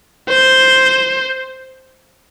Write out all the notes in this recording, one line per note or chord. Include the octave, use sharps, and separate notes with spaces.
C5